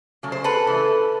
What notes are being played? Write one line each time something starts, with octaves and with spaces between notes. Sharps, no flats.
C#3 F#3 A3
C5
A4 B4
C#3 E3 A3